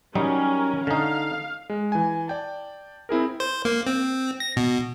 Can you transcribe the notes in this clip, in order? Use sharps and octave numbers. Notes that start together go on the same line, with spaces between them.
F#3 G3 C#4 D#4 A#4
D3 D#4 F5
G#3
E3 G#5
D5 G5 A5
C4 E4 G#4 A#4
C5
A#3
C4
A#6
B2